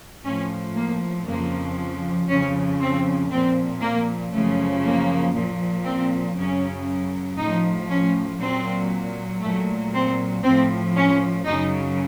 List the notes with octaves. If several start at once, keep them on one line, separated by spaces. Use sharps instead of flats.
A2 F3 C#4
A#3
F2 C#3 F3 A#3
F2 C#3 F3 C#4
C4
A#2 F3 C4
A#3
F#2 C#3 F3 A3
A#3
A#2 F3
C4
F#2 C#3 F#3 C#4
A2 F3 D#4
C#4
A#2 F#3 C4
A#2 F#3 A3
C4
A2 F3 C4
C#4
F#2 C#3 F#3 D#4